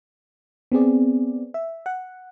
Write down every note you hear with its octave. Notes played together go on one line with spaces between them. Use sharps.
B3 C4 G#4 D5
E5
F#5